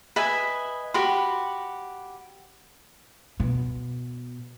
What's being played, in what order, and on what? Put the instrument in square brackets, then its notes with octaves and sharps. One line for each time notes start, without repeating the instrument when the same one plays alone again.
[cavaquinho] B4 D#5 E5 G#5
F#4 G4 B5 C6
[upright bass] B2